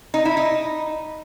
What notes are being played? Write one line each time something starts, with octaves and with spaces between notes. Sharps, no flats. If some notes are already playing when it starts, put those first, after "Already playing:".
D#4
E4
D#4